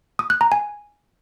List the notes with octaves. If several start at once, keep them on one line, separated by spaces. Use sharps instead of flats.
D#6
F#6
A#5
G#5